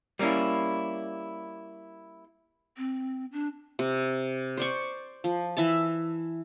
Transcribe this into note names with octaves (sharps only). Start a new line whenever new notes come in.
G3 A#3 C#4 E4
C4
D4
C3
C5 D5 C#6
F3
E3 E5 A5